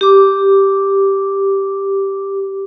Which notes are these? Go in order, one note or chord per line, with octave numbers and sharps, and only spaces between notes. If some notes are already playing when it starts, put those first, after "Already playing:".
G4 D6